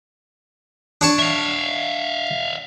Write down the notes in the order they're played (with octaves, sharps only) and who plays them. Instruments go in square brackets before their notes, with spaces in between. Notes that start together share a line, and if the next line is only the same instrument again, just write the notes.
[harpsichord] D4 C#5 A5
[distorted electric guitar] E5 F5